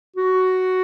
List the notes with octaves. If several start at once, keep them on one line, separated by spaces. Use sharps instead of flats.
F#4